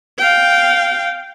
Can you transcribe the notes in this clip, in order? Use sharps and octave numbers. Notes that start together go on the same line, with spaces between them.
F5 G5